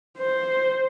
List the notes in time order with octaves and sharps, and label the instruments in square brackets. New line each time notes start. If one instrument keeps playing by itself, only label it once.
[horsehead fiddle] C5